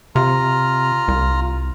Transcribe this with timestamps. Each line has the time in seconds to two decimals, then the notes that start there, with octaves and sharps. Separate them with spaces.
0.16 C3 F4 A#5 F6
1.08 C2